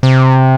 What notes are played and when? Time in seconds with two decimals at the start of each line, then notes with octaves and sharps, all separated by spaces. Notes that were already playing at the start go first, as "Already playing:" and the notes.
0.03 C3